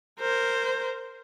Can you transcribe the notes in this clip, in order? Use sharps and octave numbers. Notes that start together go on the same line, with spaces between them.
A#4 C5